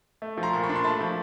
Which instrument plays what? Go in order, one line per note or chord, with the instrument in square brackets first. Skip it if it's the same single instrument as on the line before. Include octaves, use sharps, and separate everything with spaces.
[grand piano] A3
F3
A#5 C6
A#2
B5 C#6
D4
C6
A3 A5 B5
F3